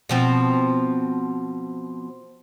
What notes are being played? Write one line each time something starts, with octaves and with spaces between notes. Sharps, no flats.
B2 F3 C4